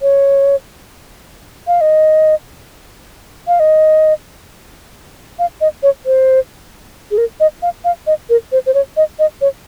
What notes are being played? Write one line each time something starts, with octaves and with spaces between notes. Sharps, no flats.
C#5
F5
D#5
F5
D#5
F5
D#5
C#5
C5
G#4
A#4
D#5
F5
F5
D#5
A#4
C5
C5
C#5
D#5
D#5
C#5